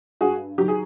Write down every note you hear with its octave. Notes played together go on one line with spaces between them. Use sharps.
G2 F#4 G#4
F#3 G4
D#3
G#4